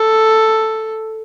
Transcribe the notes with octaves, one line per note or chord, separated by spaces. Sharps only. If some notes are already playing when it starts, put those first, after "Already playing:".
Already playing: A4